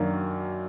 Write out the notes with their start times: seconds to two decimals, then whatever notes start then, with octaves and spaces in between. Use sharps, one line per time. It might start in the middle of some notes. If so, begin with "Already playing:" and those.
Already playing: F#2 D#3 F#3 A#3 D4